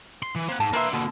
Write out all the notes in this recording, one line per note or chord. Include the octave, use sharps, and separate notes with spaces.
C6
E3
A#3 C4 F#5
G#2 A5
A#3 D4 B4 E5 C6
B2 D3 A#3 F#4